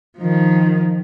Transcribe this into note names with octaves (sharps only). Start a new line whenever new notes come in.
D#3 F3